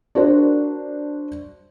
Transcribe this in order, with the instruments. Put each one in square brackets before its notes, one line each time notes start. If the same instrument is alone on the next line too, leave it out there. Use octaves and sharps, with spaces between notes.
[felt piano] D4 F#4 A#4 C5